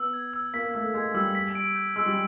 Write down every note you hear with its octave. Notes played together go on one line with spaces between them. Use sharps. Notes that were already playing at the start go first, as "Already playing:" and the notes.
Already playing: B3 E6
G#6
E6
A#3 B6
A3 E6
G#3 G#6
G3 E6
B6
D7
G6
G#3 E6
G3